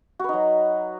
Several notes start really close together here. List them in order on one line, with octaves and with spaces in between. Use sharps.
F#4 B4 D#4 F#3